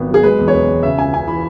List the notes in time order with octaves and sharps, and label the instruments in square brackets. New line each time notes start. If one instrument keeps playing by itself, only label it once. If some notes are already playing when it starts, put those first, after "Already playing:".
Already playing: [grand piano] G#1 B3
F#3
G#4
G#3 B4
E2
C#5
E1 B4
E1
C#3 E5
C#2 G#5
C#2 G#5
E3 B5